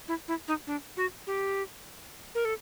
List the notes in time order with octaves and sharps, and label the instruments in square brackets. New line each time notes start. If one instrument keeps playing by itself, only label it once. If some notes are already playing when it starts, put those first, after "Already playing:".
[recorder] E4
E4
D#4
D4
F#4
G4
A#4
A4